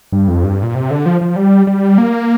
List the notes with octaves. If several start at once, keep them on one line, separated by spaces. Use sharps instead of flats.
G2
F2
G2
A#2
C3
D3
F3
F3
G3
G3
A#3